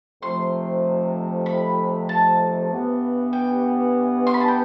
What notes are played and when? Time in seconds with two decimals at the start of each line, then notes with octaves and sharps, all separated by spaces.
0.22 F2 C3 F3 A3 C6
1.46 B5
2.09 A5
2.70 G2 E3 B3
3.33 G5
4.27 C6
4.34 B5
4.40 A5
4.48 G5